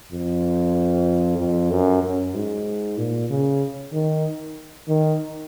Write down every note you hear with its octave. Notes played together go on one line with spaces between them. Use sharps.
F2
F2
F#2
F#2
G#2
A#2
C#3
D#3
D#3